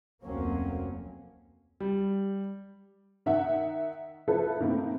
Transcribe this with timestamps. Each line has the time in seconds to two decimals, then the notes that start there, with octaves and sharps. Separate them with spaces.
0.23 F1 D2 F#3 A#3 C4 C#4
1.80 G3
3.26 D#3 E5 F#5
4.28 F3 E4 A4 B4
4.60 D#3 A3 A#3 C4 E4